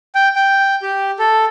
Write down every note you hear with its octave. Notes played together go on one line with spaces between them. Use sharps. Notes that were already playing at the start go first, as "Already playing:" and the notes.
G5
G5
G4
A4